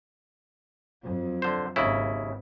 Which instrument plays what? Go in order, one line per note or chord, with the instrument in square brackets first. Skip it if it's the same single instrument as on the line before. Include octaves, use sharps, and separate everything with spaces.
[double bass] F2 F#3
[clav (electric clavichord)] D3 C5
[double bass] G#1 [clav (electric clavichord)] D#2 C#3 E4